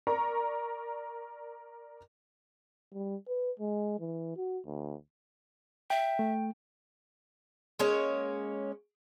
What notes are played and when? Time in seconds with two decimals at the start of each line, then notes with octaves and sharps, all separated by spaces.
0.07 A#4 D5 A#5 C#6
2.94 G3
3.28 B4
3.60 G#3
4.00 E3
4.36 F#4
4.66 D2
5.90 E5 G5
6.19 A3
7.79 G#3 A#3 C#4 C#5